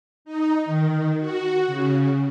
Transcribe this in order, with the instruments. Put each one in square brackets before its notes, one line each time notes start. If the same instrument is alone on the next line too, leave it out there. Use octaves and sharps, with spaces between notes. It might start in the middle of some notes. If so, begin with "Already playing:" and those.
[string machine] D#4
D#3
F#4
C#3